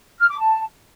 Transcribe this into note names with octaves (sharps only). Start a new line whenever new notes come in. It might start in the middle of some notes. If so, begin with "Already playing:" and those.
F6
D6
A5